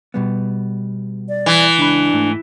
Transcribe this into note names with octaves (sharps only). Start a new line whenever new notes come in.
B2 G3 B3
D5
E3
C#2 D4 B5
G#2 A3